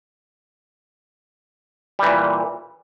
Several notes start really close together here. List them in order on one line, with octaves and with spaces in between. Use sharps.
G3 E3 A#2